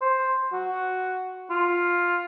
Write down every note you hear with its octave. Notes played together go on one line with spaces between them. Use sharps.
C5
F#4
F4